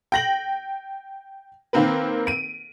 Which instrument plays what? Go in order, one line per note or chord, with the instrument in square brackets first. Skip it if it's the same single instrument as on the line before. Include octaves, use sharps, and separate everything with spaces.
[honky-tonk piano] G5 A#6 F#7
D#3 A#3 C4 A#4 B4
D7 D#7